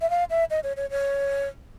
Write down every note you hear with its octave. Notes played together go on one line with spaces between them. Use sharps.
E5
F5
E5
D#5
C#5
C#5
C#5